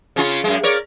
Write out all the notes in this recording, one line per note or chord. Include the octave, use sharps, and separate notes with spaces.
C#3 C#4 F4
F#2 G#3
A#4 C#5 D5